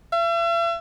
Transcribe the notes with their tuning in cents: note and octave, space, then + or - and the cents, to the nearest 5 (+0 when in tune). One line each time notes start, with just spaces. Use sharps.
E5 +45